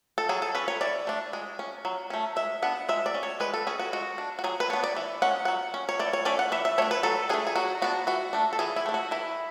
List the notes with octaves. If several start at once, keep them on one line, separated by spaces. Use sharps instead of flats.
A4
F#3 G#4
A4
C#4 B4
C#5
E3 D5
A3 D4
G#3
C#4
F#3
A3 C#4
G#3 E5
B3 D4 F#5
G#3 E5
D5
C#4
C#5
G#3 B4
A4
C#4 G#4
F#4
G#3 F#4
D4
F#4
F#3 G#4
B4
B3 D4 C#5
D5
E3
G#3 C#4 F#5
F#3 F#5
C#4
C#5
E3 D5
C#5
A3 C#4 D5
F#5
E3 E5
E5
A3 D4 C#5
B4
F#3 A4
A3 D4 G#4
G#4
F#3 F#4
B3 D4 F#4
E3 F#4
A3 D4
A4
E3 G#4
E4
A3 D4
F#4
E3 E4